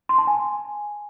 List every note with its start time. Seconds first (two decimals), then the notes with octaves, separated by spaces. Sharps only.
0.09 C6
0.18 A5
0.27 G#5